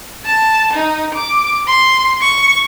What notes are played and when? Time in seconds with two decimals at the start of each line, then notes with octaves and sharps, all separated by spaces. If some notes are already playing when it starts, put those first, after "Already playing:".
0.25 A5
0.73 D#4
1.14 D6
1.67 C6
2.21 C#6